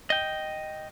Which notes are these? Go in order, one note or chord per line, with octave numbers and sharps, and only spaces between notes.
D#5 G5